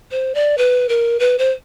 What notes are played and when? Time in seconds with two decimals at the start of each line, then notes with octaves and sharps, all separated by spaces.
0.11 C5
0.35 D5
0.58 B4
0.89 A#4
1.20 B4
1.38 C5